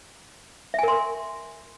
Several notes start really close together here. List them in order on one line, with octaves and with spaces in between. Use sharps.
E5 G#5 A#4 C6